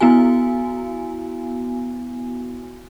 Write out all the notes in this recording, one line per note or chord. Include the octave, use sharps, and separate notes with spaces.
B3 E4 F#4 G#5